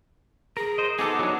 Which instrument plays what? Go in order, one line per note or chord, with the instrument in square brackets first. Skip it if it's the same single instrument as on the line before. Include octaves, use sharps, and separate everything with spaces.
[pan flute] G#4 [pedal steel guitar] A#4
[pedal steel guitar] C5 D#5
[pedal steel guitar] B3 D#4 F#4 [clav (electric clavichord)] G#4 A4 [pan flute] D6
[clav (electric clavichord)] F#3 D4